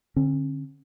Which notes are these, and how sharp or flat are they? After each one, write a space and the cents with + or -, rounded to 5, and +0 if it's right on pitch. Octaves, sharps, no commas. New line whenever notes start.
D3 +0 C#4 -45